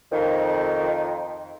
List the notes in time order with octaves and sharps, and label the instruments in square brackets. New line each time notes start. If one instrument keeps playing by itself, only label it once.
[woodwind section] F2 D#3